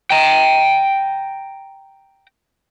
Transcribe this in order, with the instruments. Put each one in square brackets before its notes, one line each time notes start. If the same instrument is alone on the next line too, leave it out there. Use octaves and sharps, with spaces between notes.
[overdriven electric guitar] G5 A#5